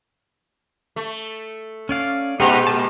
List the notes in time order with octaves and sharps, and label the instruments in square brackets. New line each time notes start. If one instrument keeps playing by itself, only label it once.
[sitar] A3
[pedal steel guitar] C#4 D5 F5
[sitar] A#2 G#3 G4 [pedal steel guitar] D#4 F#5 A#5
[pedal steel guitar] A#4 D#5 A5